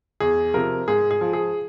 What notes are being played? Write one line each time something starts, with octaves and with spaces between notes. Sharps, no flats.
E2 G#4
C3 F3 A#4
G#2 G#4
G#4
F3
G#4